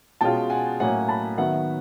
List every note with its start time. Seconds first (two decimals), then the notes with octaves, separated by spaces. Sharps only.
0.21 B2 G#3 C#4 F4 G5 A5
0.50 F#5 G#5
0.80 A2 F#3 A#3 C#4 F#5 G#5
1.09 A5 B5
1.38 D#3 F#3 B3 E5 F#5